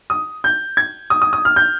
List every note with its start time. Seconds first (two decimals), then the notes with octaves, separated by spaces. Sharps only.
0.10 D#6
0.44 G6
0.77 G#6
1.10 D#6
1.22 D#6
1.33 D#6
1.45 F6
1.56 G6